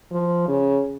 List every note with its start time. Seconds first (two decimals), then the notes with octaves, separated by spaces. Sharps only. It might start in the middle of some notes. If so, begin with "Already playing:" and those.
0.12 F3
0.48 C#3